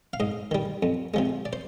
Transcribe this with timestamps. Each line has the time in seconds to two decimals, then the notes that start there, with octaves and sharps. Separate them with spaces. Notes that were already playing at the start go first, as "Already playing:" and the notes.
0.13 F5
0.20 G#2 D#5
0.51 D#3 G3
0.83 F2
1.14 C3 F3 G#3
1.45 D5
1.53 C5